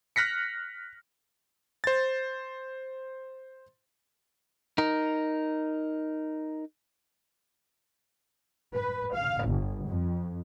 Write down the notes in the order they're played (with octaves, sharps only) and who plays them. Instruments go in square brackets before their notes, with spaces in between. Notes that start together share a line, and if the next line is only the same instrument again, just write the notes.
[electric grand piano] F6 F#6 A#6 B6 C#7
C5 A6
[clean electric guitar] D#4 A#4
[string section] B4
F5
G1
F2